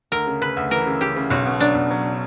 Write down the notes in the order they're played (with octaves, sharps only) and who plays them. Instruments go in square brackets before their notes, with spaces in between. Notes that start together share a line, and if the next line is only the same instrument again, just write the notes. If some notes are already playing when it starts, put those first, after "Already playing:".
[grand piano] D2 [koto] A#4
[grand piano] C#3
[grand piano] C#3 [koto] B4
[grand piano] D2
[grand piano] E3 [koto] A#4
[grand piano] C#3
[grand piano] C#3 [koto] G4
[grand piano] C#3
[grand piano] B1 [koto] F#4
[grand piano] B2
[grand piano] F#3 [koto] D4
[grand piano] B1
F#3